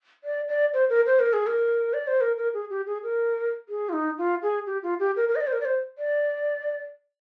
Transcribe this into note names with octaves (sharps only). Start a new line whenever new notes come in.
D5
D5
C5
A#4
C5
A#4
G#4
A#4
D5
C5
A#4
A#4
G#4
G4
G#4
A#4
G#4
F4
D#4
F4
G#4
G4
F4
G4
A#4
A#4
D#5
D5
C5
A#4
D5
C5
D5